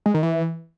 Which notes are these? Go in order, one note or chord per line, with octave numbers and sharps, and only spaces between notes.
G#3
D#3
E3